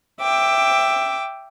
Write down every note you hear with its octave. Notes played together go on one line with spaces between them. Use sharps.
E5 G5 D6